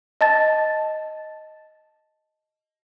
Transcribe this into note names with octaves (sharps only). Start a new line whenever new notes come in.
D#5 A5 A6